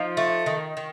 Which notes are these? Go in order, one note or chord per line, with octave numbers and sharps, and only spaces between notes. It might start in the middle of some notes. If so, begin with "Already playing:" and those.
Already playing: F3 D#4 F4
A3
D#3
D#3